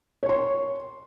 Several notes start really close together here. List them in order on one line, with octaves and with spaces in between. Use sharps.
C#5 C#6 C6